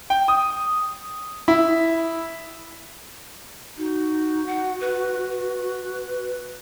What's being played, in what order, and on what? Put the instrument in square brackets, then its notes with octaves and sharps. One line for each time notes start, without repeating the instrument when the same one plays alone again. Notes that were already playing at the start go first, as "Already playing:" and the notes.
[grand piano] G5
D#6
E4
[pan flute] D#4 [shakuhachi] F#4
[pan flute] F#5
B4
B4